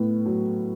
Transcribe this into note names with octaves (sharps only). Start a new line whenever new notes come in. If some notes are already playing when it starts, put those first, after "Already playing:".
Already playing: A2 B3
F#3